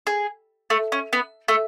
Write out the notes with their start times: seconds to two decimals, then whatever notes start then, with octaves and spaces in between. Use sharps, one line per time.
0.07 G#4
0.70 A3
0.92 C#4
1.13 B3
1.48 A3